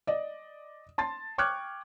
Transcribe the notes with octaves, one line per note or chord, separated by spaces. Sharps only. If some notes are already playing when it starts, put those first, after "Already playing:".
D5 D#5
A5 C6 A6
G5 C#6 D6 F6 F#6 G#6